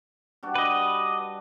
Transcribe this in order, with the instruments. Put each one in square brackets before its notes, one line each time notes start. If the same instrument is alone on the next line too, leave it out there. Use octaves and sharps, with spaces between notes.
[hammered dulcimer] G3 D4 F#4
[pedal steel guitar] B4 D#5